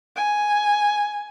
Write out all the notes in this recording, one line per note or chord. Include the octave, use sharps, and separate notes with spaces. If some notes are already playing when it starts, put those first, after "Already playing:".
G#5